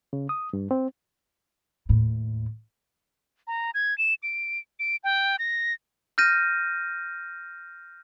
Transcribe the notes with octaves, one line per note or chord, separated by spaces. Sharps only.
C#3
D#6
G2
C4
D#2 A2
A#5
G#6
E7
D7
D7
G5
A#6
F6 G6 A#6 D#7